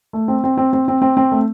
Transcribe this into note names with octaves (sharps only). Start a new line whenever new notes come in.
A3
C4
C4
C4
C4
C4
C4
C4
A3